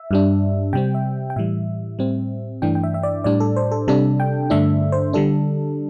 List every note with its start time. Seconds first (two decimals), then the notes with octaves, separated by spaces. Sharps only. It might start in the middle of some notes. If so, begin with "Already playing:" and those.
Already playing: E5
0.11 G2 G3 D4
0.73 C3 G3 C4 G5
0.94 E5
1.30 G5
1.36 A2 E3 G3 E5
1.99 A2 G3 C4
2.62 G2 E3 A3 D4 G5
2.75 G5
2.83 E5
2.94 E5
3.03 D5
3.24 A2 G3 D4 D5
3.40 A4
3.56 C5
3.71 A4
3.88 C3 G3 D4 A4
4.20 G5
4.50 G2 D3 A3 D4 E5
4.92 C5
5.13 D3 G3 D4 A4